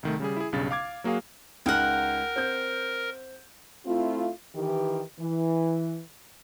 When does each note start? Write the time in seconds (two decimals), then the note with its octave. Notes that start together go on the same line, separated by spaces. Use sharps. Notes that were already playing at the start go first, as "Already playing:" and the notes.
0.03 C2 D#3 A3
0.20 C#3 G3 G#4
0.36 E4 G#4
0.53 B1 G2 C#3 A6
0.71 F5 D6 G#6
1.04 F#3 A#3 F#4 G#4 F5
1.66 C#2 D#4 A#4 F#5 G5 F6
2.36 C4 G6
3.86 A3 C4 E4 F4
4.55 D#3 E3 G4
5.19 E3